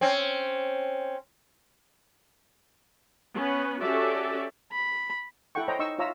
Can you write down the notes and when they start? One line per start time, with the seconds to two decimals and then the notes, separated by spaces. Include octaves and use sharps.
0.01 C4 C#4
3.34 B3 C#4 B4
3.81 C#4 F#4 G4 A4 D5 E5
4.72 B5
5.55 E4 A4 F#5 G5 C#6
5.68 C5 C#5 D#5 G5 A#5
5.79 D#4 D#5 C#6 E6
5.99 F4 C#5 E5 A#5 E6